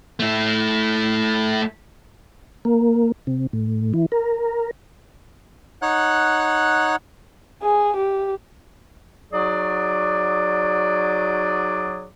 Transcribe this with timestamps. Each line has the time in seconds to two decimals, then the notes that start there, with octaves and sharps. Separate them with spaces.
0.20 A3 E4
2.65 A#3
3.27 C3
3.53 A2
3.94 E3
4.12 A#4
5.82 D#4 C#5 F#5 F#6
7.62 G#4
7.96 G4
9.33 F#3 D#4 F#4 G#4 D5